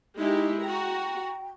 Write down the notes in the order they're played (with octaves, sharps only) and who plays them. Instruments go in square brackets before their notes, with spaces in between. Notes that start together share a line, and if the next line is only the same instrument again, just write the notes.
[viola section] G#3 E4 G4 [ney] D#4
[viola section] F#4 A#5 [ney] G5